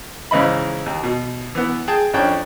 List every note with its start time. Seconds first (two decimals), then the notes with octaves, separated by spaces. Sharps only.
0.31 G#2 C#3 E3 D#5 B5
0.86 D#2
1.03 B2
1.55 E3 B3
1.88 G#4 G5 A5
2.13 F2 C#4 D4 G5